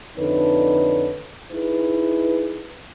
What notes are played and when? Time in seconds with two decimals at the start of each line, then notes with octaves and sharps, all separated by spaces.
0.17 F2 D3 D#4 A4 B4 C#5
1.52 D#4 E4 G#4 B4